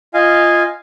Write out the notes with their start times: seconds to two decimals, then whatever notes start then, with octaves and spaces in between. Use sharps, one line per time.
0.14 F4 D#5 F5 G#5